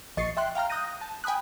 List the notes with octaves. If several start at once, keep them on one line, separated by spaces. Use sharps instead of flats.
A#1 D#5 C#6 A6 C7 C#7
E5 G5 C6 F#6
F5 G5 A#5 F6
D#6 F#6 G6 A#6 D#7
A5
G5 G#5 B5 D#6 F#6